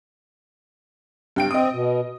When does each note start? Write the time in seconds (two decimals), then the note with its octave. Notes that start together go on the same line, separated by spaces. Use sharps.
1.36 G2 G5 D7
1.51 C4 D#5 D#6
1.71 B2